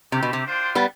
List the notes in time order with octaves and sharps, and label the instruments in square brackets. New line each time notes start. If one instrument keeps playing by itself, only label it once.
[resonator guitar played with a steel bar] C3 [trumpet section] A3 C4 G4
[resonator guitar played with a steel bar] B2
C3
[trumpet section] D4 F4 C5 G5
[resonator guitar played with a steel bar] G3 B3